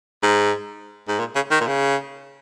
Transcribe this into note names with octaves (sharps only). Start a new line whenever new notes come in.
G#2
G#2
A#2
C#3
D#3
A#2
C#3